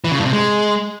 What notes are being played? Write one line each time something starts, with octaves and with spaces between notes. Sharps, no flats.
E3
C#3
G2
C3
G#3